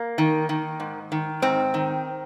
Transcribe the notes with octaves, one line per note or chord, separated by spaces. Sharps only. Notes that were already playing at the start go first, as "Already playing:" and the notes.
Already playing: A#3
D#3
D#3
G#2
D#3
G#2 C4
D#3